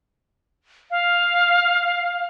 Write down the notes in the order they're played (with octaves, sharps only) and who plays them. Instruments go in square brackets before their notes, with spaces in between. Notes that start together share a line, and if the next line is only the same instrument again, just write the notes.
[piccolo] F5